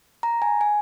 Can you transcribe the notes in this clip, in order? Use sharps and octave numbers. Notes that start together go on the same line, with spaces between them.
A#5
G#5
G#5